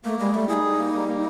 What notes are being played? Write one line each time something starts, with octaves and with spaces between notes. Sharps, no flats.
A3 A#3
G3 G#3
G3 A3
D#4 E4 G#4
G3
A#3
G3
A#3